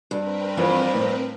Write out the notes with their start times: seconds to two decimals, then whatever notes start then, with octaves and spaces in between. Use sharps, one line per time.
0.11 G2 C4 A#4 B4
0.57 F2 E3 F4
0.94 A2